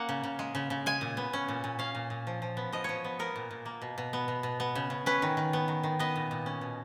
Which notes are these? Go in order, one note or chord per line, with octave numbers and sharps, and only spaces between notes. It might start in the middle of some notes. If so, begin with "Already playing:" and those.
Already playing: A#3 C#4 F#5
C#3
C#3
G#3
C#3
C#3
G#3 G#5
A#2
B3
C#4
A#2
A#2
C#4 F5
A#2
A#2
F3
F3
B3
F3 D#5
F3 C#5
B3
B3 A#4
A#2
A#2
A#3
B2
B2
B3
B2
B2
B3
C#3
C#3
C#4 B4
D#3
D#3
B3
D#3
D#3
B3 D#5
A#2
A#2
C#4
B2